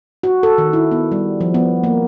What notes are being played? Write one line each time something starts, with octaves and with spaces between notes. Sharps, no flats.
F#4
A4
D#3
E4
B3
G3
F3
B3
A#3